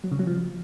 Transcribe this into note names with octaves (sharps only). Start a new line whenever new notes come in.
F#3
C#3
F#3
F3